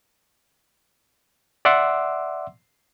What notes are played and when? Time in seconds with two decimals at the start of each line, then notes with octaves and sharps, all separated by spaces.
1.65 D5 E5 F#5 C6 D6 E6